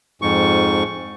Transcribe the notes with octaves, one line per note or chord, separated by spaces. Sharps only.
F2 G#2 C#6